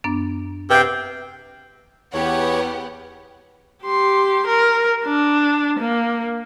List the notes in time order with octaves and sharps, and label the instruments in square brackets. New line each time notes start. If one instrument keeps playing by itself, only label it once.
[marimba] F#2 B3 D4
[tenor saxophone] C3 [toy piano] B4 F#5 [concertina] G5
[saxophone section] E2 [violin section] B3 G4 F#5 [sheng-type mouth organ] C#5
[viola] G4 C6
A#4
D4
A#3